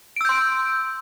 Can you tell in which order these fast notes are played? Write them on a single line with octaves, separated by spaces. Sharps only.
D7 E6 G6 C6